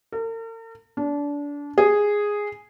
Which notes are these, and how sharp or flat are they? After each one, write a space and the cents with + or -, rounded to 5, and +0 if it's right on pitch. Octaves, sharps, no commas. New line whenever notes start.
A#4 -45
D4 -25
G#4 -5